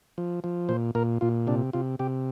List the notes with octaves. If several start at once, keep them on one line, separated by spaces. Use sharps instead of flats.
F3
F3
A#2 C5
A#2 A#4
A#2 F4
C3 D4
C3 F4
C3 G4